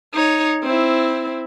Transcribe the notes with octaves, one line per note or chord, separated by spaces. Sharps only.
D#4 C#5
C4 E4